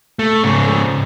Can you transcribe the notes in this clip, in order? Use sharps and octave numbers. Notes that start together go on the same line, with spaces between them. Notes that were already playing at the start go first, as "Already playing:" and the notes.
A3
G#2 C#3